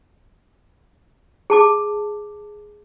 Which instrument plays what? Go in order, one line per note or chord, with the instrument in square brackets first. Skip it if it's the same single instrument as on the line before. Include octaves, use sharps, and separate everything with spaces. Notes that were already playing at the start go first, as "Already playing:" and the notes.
[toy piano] G#4 A5 D6